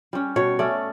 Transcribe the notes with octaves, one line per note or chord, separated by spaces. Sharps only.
G3 C#4
B2 C#5
A3 C#4 D5